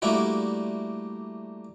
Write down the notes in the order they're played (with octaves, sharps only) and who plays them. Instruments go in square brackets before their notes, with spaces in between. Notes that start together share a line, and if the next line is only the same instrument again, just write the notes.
[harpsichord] G3 A3 A#3 D4 E4 F#4